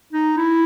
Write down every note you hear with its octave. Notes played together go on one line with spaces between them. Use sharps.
D#4
E4